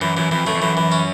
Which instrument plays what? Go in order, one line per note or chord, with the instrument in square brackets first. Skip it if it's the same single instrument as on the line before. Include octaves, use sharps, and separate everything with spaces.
[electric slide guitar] F#2 [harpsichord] E3
[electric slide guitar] F#2 [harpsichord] E3
[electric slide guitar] F2 [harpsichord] E3
[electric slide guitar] F#2 [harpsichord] A3
[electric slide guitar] F2
[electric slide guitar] F#2 [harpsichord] E3
[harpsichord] E3
C#4